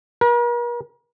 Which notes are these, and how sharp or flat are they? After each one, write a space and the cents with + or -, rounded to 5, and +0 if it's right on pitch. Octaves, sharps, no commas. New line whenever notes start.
A#4 +45